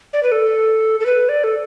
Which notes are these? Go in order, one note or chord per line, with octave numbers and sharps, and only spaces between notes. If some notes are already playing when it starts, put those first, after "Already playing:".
D5
B4
A4
A4
B4
D5
A4